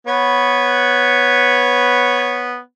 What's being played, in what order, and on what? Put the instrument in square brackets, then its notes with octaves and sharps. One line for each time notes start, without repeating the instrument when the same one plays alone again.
[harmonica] B3 B4 C#5